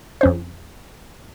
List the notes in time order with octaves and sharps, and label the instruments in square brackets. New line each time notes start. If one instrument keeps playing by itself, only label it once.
[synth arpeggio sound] F2 C#4 C5